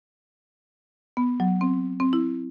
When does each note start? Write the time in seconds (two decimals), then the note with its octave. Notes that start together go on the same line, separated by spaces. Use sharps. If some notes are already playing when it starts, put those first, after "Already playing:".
1.17 B3
1.40 F#3
1.61 C4
2.00 C4
2.13 E4